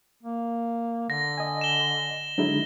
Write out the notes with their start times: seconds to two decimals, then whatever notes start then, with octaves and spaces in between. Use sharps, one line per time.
0.23 A#3
1.10 D3 A#6
1.38 D#5 G#5
1.61 E7 G7
2.38 D3 F#3 G#3 D#4 E4